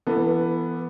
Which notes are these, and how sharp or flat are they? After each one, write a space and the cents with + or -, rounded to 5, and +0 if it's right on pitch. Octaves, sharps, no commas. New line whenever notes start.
E3 +25 B3 +0 A4 +30